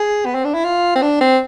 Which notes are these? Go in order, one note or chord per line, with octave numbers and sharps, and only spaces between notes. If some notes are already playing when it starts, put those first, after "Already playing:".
Already playing: G#4
B3
C4
D4
E4
F4
C4
D4
C4